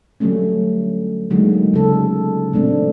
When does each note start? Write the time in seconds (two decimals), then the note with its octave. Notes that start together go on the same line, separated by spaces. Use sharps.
0.20 D3 F#3 G3 A3 C#4
1.30 D3 F#3 G#3 A#3 D#4
1.74 C#3 A4
2.53 A#2 E3 A3 C4 D4